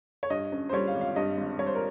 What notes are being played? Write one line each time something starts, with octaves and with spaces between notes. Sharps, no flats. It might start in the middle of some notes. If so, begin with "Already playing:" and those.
C#5
G2 D#5
C#4
C5
G3 C#5
F5
G#1
F5
G2 D#5
G#1
G3 C#5
C5
A#4